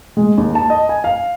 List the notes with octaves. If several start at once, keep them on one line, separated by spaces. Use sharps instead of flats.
G#3
D#2
A5
D#5
G#5
F5